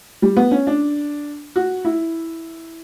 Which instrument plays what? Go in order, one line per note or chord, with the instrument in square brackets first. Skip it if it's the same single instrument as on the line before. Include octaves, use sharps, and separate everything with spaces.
[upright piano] G3
B3
C#4
D4
F#4
E4